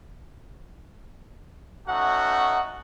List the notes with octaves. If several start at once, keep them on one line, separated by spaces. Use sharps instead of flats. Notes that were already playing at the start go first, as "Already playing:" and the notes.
A3 C#4 D#4 F#4 F#5